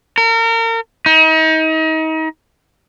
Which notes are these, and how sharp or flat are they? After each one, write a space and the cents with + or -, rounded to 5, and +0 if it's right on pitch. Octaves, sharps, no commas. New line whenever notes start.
A#4 -35
D#4 +35